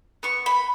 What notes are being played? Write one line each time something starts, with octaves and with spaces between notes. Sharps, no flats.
B3 C#6
B5